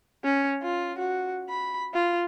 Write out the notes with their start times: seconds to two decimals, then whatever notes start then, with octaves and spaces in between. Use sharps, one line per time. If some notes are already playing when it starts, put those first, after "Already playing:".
0.24 C#4
0.63 F4
0.98 F#4
1.49 B5
1.94 F4